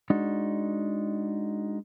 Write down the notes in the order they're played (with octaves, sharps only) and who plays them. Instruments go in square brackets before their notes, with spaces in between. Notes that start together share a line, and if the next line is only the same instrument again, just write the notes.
[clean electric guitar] G#3 D4 D#4 F#4